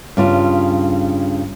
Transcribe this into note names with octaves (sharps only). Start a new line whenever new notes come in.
G2 C#3 F4